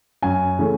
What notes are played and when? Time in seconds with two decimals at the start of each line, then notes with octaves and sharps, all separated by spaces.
0.22 F#2 G#5
0.59 C#3 E3 A3 C#4